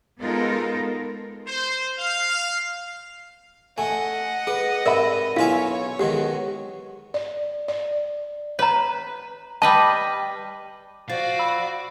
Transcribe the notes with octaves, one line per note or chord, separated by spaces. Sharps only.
G#3 B3 D#4 F4 A4 A#4
C5
F5
A3 D#5 F#5 G#5
G#4 B4
G#2 C3 A#4 D5 E5 B5
B1 E4 F4 C#5 E5 F5 G#5
B1 B2 D#3 G#3 G4
D5
D5
B4 C#5 A#5
G3 B4 D#5 A5
F3 F#4 D5 F5 A6
B5 E6